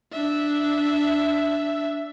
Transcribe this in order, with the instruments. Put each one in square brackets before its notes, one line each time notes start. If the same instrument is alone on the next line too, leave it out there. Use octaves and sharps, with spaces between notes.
[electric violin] D4 E5